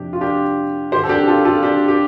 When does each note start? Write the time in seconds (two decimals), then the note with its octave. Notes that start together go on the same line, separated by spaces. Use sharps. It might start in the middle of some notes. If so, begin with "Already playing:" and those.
Already playing: F2 C3 D4 G4
0.13 F4
0.21 D4 G4
0.92 G2 G4 C5
0.96 D3
1.03 A4
1.09 D4 G4
1.27 F4 A4
1.45 F4 A4
1.63 D4 G4
1.88 G4